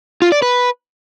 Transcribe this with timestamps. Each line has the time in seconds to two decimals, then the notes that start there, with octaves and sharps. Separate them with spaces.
0.22 F4
0.32 D5
0.42 B4